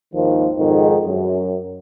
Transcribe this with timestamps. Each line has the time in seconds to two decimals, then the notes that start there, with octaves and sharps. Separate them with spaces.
0.14 G#1 D#2 D#3 F3
0.59 F2 G#2 D#3 G#3
1.06 F#2